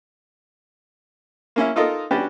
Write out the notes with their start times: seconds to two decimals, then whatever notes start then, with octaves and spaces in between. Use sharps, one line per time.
1.56 A#3 C#4 E4
1.76 D#4 F4 A4 A#4 D#5
2.11 C#4 D4 F#4 G4 B4 D5